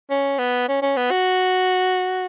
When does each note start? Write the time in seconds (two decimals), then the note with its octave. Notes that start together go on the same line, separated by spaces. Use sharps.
0.10 C#4
0.38 B3
0.68 C#4
0.82 C#4
0.97 B3
1.10 F#4